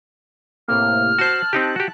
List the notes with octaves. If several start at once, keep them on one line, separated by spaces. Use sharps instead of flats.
A2 C3 A#3 F6
F#4 C5 A5 F#6
C4 D#4 G4
F#4 G4